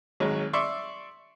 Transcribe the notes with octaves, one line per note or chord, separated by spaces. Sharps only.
G#1 F#3 G#3 C#5
D5 E5 C6 C#6